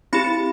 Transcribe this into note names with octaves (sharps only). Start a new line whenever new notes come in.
C4 E4 G4 B5